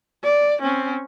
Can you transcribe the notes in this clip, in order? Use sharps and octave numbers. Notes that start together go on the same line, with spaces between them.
D5
C4 C#4